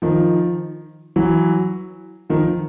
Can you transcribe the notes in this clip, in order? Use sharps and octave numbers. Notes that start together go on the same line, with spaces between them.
D#3 F3
E3 F#3
D#3 F3